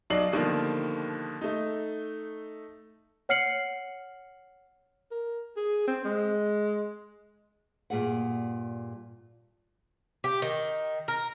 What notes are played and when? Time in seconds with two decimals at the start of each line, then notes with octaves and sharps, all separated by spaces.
0.10 B1 F#3 D#4 D5 C7 F#7
0.32 B2 D3 D#3 F3 G3 A#3
1.41 A3 D#4
3.29 C#5 F#5 F6 C7 C#7 F#7
5.11 A#4
5.56 G#4
5.87 C4
6.05 G#3
7.90 G2 A#2 G#4 F#5
10.24 G4
10.42 D#3
11.08 A#4